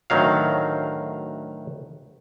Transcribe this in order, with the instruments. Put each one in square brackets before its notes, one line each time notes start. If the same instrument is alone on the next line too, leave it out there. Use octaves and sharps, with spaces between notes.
[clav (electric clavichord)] D2 A2 D#3 F#3 F5